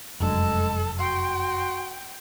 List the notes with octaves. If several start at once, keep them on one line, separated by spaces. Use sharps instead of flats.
F1 F#2 G#3 D4 A4
F#4 G5 C6